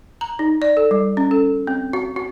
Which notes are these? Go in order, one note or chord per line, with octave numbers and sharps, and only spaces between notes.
A#5
D#4
D5
A4
G3
C#4
A4
C4
F#4
F#4